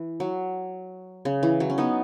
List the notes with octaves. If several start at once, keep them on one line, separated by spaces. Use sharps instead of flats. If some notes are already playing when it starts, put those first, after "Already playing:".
Already playing: E3
F#3
C#3
E3
F#3
C#4
B3 D#4